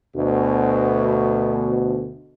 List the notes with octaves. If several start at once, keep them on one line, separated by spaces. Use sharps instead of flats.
D2 B2